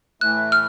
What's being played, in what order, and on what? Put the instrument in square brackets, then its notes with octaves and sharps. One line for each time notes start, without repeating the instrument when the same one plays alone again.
[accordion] A2 E3 A3 [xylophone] F#6
[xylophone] F6